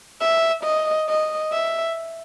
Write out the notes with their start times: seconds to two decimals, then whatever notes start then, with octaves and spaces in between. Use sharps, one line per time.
0.21 E5
0.64 D#5
1.09 D#5
1.52 E5